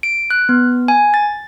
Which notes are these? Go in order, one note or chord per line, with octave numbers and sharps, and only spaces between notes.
D7
F#6
B3
G#5
A6